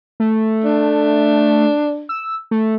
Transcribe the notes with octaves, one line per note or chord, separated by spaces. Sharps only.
A3
D4
E6
A3